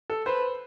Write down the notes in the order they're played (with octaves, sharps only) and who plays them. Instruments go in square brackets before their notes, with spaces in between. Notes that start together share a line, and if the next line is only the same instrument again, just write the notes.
[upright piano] A4
[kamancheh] B4 [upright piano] C5